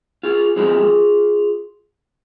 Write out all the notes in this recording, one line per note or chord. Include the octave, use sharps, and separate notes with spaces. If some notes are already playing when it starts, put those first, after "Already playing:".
F4 G#4
F3 G#3 C4 F4 G#4